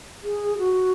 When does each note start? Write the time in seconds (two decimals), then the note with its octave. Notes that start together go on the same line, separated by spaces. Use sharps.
0.23 G#4
0.58 F#4